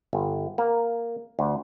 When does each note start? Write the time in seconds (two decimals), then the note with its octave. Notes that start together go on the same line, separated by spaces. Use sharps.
0.13 G1
0.58 A#3
1.39 D2